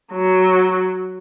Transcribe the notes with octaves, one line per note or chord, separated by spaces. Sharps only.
F#3